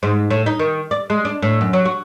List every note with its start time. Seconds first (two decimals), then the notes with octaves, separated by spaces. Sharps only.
0.03 G#2
0.30 A2
0.46 D#4
0.60 D#3
0.91 D5
1.10 G#3
1.25 D4
1.42 A2
1.61 F#2
1.73 F#3
1.85 F#4